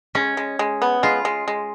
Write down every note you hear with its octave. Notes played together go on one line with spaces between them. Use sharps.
G#3 C#4
G#3
G#3
B3
G#3 F4
G#3
G#3